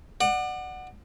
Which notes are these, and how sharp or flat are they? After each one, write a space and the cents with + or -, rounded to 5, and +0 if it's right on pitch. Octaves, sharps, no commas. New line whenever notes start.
D5 +35 F#5 +0